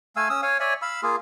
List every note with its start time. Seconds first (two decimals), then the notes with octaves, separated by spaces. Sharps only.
0.16 A3 F5 G#5 E6
0.29 C#4 D#6 E6
0.42 C#5 F5 G#5
0.60 C#5 D5 E5 G#5
0.82 F5 B5 E6
1.03 A#3 F4 G#4